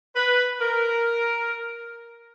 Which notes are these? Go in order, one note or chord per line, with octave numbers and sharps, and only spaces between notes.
B4
A#4